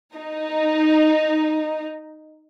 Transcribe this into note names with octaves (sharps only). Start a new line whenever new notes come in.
D#4